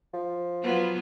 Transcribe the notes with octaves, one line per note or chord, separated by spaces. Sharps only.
F3
F#3 B3 F4